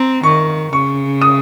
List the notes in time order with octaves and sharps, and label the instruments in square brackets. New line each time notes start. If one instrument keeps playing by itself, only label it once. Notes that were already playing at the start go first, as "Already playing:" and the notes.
Already playing: [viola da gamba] C4 [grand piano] A#5
[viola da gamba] D#3 [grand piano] C#6
[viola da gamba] C#3 [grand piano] C#6
[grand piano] D#6